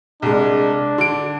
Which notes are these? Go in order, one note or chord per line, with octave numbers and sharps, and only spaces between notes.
C2 G#3 D4
D3 D7